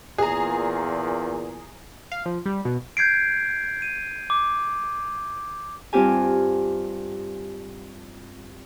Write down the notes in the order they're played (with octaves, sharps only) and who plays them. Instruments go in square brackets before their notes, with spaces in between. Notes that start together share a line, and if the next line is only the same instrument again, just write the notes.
[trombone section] E2 A#2 [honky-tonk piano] G#4 A#5
[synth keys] F5
F3
G3
B2
[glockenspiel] G6 G#6 C7 D7
D#7
D6
[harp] G2 C4 F4 G4 G#5